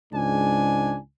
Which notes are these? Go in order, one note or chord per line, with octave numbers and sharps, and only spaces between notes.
C#2 G#2 D4 G#5